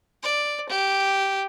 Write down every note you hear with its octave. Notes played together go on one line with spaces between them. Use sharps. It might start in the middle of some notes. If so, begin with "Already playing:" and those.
D5
G4